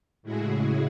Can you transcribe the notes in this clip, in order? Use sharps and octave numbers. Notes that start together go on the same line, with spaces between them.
A2 C#3 G#3 E4 F#4 G#4